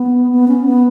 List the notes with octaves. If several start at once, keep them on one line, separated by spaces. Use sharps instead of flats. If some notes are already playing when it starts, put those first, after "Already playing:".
Already playing: B3
B3
C#4
B3